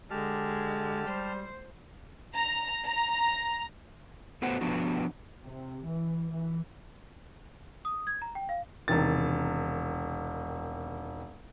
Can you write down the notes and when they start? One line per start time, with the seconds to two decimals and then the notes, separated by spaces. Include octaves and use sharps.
0.11 D3 G#3 G4 A5 F6
1.06 G3 C5
2.36 A#5
2.86 A#5
4.42 A3 B3 F#4 C5 F#5
4.61 F3 B3 D4 F#4
5.44 C3
5.86 E3
6.32 E3
7.85 D#6
8.07 G#6
8.22 A#5
8.35 G5
8.49 F5
8.88 E1 C3 D#3 A6